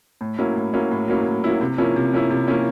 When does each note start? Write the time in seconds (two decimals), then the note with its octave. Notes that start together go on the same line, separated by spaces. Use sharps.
0.21 A2
0.38 F#3 A#3 C#4 E4
0.56 A2
0.74 F#3 A#3 C#4 E4
0.91 A2
1.08 F#3 A#3 C#4 E4
1.26 A2
1.44 F#3 A#3 C#4 E4
1.61 C3
1.78 F3 A#3 C#4 E4
1.96 C3
2.13 F3 A#3 C#4 E4
2.30 C3
2.47 F3 A#3 C#4 E4